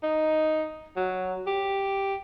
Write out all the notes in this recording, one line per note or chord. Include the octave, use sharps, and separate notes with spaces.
D#4
F#3
G4